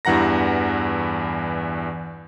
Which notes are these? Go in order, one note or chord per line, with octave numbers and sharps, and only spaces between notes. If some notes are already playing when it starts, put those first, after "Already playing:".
E2 G2 E3 F#5 A#5 A#6